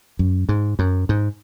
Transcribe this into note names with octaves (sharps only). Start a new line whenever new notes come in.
F#2
G#2
F#2
G#2